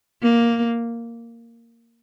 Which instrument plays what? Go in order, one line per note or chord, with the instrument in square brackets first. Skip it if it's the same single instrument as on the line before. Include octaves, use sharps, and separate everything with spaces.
[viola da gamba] A#3